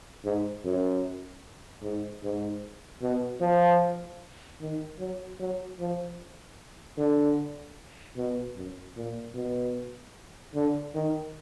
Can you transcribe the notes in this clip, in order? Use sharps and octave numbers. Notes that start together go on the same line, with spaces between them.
G#2
F#2
G#2
G#2
B2
F3
D#3
F#3
F#3
F3
D3
B2
F#2
A#2
B2
D3
D#3